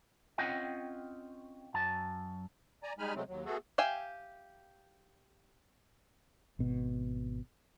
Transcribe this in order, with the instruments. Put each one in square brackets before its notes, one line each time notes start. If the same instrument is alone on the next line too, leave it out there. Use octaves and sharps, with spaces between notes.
[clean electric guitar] C4 C#4 F4 D#5 F#5 G5
F#2 F#3 A5
[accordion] D5 G#5 A#5
G3 G#3 D#4 G#5 B5 F6
C3 F#3 G#3 A3 C4
D#2 F#3
A3 B3 F#4 G#4 A4
[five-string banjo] G4 E5 F5 G5 G#5
[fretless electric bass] G#1 B2